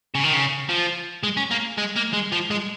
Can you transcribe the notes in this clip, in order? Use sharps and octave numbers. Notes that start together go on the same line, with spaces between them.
C#3
D#3
C#3
F3
G#3
C#4
A#3
G#3
A#3
G#3
F3
G#3